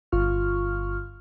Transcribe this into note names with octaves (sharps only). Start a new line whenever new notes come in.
G1 F4 C#6 F6